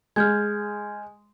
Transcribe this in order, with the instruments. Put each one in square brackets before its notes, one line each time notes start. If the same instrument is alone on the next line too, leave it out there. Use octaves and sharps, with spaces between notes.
[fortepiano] G#3 [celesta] F6 G6 G#6